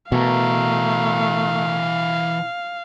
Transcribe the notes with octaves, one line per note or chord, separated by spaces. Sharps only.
B2 E3 A3 A#4 F5